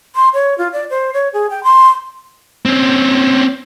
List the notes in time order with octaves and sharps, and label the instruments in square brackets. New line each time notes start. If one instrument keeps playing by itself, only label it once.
[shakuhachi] C6
C#5
F4
D5
C5
C#5
G#4
G5
C6
[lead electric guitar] C4 C#4